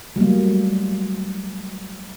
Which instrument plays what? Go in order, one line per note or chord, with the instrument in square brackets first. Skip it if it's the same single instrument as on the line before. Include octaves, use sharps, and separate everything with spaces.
[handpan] F#3 G3 A3 A#3